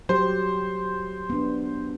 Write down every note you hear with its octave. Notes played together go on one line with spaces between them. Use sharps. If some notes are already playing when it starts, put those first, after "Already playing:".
F#3 G4 C5
B3 D4